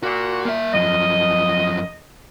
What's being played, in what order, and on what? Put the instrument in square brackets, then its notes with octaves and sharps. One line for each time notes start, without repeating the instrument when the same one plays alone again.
[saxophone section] A#2 [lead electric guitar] F#4
[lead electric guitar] A#3 E5
[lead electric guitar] F#2 F3 [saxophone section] D#5